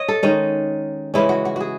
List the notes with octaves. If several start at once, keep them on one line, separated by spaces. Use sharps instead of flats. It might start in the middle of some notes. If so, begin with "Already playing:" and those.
Already playing: C#5 D#5
A4
D#3 G#3 C#4
C#3 E3 G#3 C#4 E4
F#4
F#4
F#4 G#4